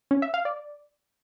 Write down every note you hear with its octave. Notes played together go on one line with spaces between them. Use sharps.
C#4
E5
F5
D5